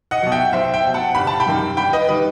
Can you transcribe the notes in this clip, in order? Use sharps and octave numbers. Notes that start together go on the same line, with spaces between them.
D#5 F#5
B2 F#3 F#5
E5 G5
B1 C5 E5
E5 G5
B2 F#3
F#5 A5
G1 B5
A5
G5 B5
F#2 D#3 G3
G1 G5 B5
B4 D#5
D#3 G3 B4